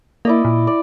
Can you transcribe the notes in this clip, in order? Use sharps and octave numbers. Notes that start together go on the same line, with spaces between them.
A#3 E4 D5 D#5
A#2
D5